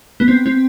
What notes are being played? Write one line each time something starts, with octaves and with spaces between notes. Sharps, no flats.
B3
C4
C4